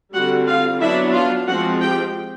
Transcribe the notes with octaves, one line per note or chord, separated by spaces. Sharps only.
D3 G3 C4 F#4 F#5
F4 F5
F#3 B3 D4 E4 E5
F4 F5
F3 G#3 C4 F#4 F#5
G4 G5